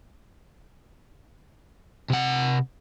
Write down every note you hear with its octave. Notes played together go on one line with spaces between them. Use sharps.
C3 F#5